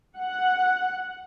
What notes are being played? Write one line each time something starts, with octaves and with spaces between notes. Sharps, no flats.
F#5